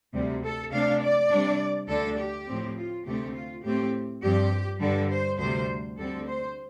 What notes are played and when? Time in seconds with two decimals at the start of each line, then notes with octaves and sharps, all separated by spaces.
0.13 D2 C3 G3
0.43 A4
0.71 C3 A3 D4 F5
1.01 D5
1.30 C3 G3 D4
1.88 D2 D3 A3 D4 A4
2.18 G4
2.47 A2 F3 C4
2.76 F4
3.05 D2 C3 A3 C4 G4
3.34 F4
3.64 A2 A3 C4 G4
4.22 G2 F3 C4 G4
4.80 G2 D3 G3 A4
5.10 C5
5.39 D2 C3 G3 C5
5.98 D2 D3 G3 C4 A4
6.26 C5